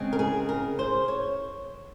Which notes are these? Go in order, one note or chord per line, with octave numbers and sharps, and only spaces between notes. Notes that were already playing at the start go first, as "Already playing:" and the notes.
Already playing: C#3 G#3 C4
A#4
G#4
A#4
C5
C#5